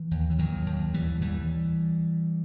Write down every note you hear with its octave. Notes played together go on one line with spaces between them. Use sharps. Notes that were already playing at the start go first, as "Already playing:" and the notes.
Already playing: E3
D#2
E3
D#2 D#3 F#3
D#2
D#2 E3 G3
D#2 E3 G3